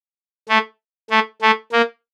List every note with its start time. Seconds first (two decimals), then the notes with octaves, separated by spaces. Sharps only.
0.49 A3
1.10 A3
1.42 A3
1.72 A#3